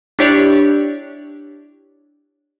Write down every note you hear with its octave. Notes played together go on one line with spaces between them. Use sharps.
D4 E4 G4 C#5 D5